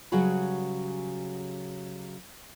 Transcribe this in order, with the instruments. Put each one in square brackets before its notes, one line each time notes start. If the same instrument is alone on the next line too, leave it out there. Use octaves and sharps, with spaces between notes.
[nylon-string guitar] C#3 F#3 G3 F#4 G#4 B4